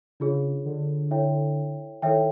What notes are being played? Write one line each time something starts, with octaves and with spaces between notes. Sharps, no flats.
C#3 D4 F4 G#4 C#5
D3
E4 A4 C#5 E5 G5
D#3 E4 A4 C#5 E5 G5